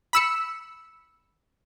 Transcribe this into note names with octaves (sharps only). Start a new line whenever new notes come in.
B5 E6 C#7